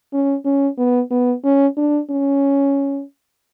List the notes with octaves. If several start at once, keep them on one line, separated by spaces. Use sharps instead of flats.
C#4
C#4
B3
B3
C#4
D4
C#4